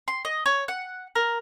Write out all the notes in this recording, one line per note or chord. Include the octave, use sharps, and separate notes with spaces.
C6
D#5
C#5
F#5
A#4